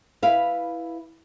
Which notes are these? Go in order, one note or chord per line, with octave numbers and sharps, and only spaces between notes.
E4 B4 F5